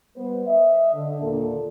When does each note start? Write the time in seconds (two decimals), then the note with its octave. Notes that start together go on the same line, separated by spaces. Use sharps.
0.16 G3 B3 B4 C5
0.47 D#5 E5
0.93 D3
1.21 D#2 A#2 A4